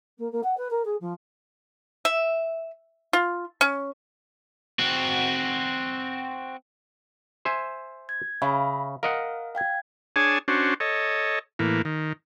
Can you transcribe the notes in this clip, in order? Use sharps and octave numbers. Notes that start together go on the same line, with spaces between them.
A#3
A#3
F#5
B4
A#4
G#4
F3
E5
F4
C#4
C4 F#4
C5 E5 G#5
G#6
C#3 E5 F5 B5
A#4 D#5 F5 F#5
F5 G5 G#6
D4 G#4 C#5 G#5 A5
C#4 D4 F#4 C5
A4 C#5 D#5
A2 E3 A#3
D#3